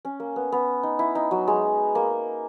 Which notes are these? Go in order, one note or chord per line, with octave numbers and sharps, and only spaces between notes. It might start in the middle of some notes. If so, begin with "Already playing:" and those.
C#4
A#3
B3
B3
D#4
E4
D#4
F#3
G#3
A#3